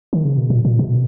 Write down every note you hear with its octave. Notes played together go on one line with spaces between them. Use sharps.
D#3
C#3
B2
A#2
A#2
B2